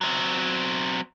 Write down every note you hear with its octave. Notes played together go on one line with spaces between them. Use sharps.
F#3 C4